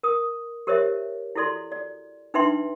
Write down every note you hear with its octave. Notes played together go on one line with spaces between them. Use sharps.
A#4 D#6
G4 A#4 C5 C#5 D#5 E5
E4 F#4 A4 D5 C6
D5
D4 D#4 B4 E5 G5 C6